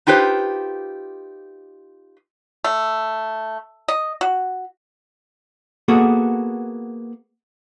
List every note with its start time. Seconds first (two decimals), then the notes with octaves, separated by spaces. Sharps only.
0.07 D#4 F4 G4 B4 C5
2.64 A3
3.88 D#5
4.21 F#4
5.88 A#3 B3 F#4 G#4 A4